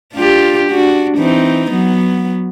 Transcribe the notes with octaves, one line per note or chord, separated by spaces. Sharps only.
D4 F4 G4
D4 F#4
E3 C4 D#4
F#3 B3